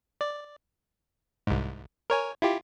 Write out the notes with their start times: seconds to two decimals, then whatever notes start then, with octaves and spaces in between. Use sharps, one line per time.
0.21 D5
1.47 C2 G#2
2.10 A#4 C#5 G#5
2.42 E4 F4 G4